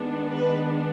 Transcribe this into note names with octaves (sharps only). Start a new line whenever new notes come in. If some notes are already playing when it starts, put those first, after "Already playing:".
Already playing: D#3 G#3 B3 D4
B4